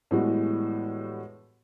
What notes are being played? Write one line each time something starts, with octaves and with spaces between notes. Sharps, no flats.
A2 E3 G3 G#3 B3 F#4